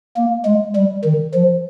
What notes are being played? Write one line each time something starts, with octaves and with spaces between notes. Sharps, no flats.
A#3
G#3
G3
D#3
F3